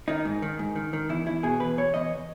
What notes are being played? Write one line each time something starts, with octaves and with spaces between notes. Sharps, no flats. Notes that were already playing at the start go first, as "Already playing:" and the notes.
D#3 D#4
G#2
D#3
G#2
D#3
D#3
E2 E4
E2 E4
B2 G#4
E2 B4
E2 C#5
E2 D#5